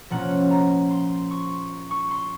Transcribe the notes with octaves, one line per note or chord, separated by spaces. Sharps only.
A#2 F3 A#3 C#4 F#5
A#5
C6
C#6
C#6
C6